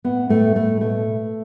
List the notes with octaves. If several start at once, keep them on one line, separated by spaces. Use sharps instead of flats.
A2 B3
A2 A3
A2 A3
B2 A3